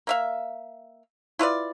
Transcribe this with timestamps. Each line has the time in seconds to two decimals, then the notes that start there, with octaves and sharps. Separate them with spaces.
0.07 A#3 E5 F5
1.39 E4 F4 B4 D5